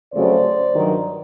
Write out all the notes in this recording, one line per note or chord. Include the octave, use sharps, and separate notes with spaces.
F2 C#3 F#3 A3 C5 D5
G2 D#3 F#3